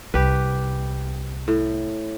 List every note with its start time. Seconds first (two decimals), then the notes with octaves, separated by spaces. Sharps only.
0.14 C2 G4 B4
1.48 A2